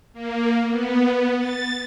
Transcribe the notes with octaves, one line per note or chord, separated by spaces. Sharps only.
A#3
B3
A6